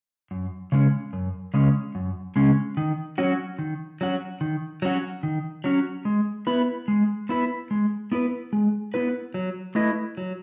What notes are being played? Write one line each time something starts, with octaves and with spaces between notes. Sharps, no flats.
F#2
C#3 G#3 C#4
F#2
C#3 G#3 C#4
F#2
C#3 G#3 C#4
D#3
F#3 C#4 F#4
D#3
F#3 C#4 F#4
D#3
F#3 C#4 F#4
D#3
F#3 C#4 F#4
G#3
B3 E4 B4
G#3
B3 E4 B4
G#3
B3 E4 B4
G#3
B3 E4 B4
F#3
A3 E4 B4 D#5
F#3